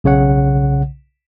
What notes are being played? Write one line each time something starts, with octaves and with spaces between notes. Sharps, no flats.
B1 C#3 C#5 F#5